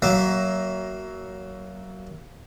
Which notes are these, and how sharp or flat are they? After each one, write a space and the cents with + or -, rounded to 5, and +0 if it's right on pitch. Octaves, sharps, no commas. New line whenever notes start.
F#3 +20 A#3 +0 E5 -10